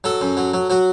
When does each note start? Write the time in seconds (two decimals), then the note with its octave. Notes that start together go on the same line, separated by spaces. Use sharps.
0.04 F#3 A4
0.21 F#2
0.37 F#3
0.54 F#3
0.70 F#3 F#4